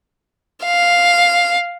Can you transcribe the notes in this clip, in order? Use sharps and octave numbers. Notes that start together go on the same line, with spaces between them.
F5